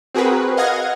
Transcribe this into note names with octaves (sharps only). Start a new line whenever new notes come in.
C4 F#4 G#4 A#4 B4
D#5 F5 F#5 G#6 A#6